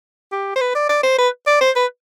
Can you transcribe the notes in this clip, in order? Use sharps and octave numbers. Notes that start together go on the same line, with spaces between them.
G4
C5
B4
D5
D5
C5
B4
D5
C5
B4